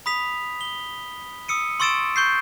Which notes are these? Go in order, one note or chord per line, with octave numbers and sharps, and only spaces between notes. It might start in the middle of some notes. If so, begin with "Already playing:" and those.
B5 D#6 B6 F7
G7
D#6 E6 C#7 D#7
C6 C#6 E6 A6 D7 E7
C#6 G6 C7